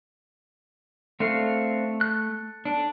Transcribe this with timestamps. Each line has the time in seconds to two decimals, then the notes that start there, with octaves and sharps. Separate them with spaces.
1.20 A3 C4 D4 F5
2.01 A4 F#6
2.65 D4